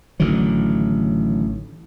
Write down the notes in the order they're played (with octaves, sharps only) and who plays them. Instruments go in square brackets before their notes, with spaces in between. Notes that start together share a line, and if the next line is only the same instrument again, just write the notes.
[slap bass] A1 D3 D#3 F#3